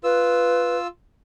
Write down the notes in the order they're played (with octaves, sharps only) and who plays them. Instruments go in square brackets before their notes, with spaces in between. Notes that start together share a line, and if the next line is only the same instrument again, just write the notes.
[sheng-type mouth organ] F4 E6 [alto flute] B4